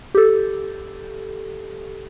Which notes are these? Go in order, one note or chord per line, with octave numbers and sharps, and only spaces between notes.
G4 A4